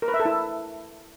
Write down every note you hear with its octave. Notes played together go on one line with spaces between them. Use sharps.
A#4
B4
E5
A4
E4